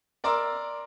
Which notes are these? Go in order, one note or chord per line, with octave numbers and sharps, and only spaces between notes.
A#4 D5 A#5 C6 E6